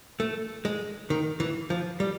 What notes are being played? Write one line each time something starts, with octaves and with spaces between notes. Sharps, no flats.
A3
G#3
D#3
E3
F3
G3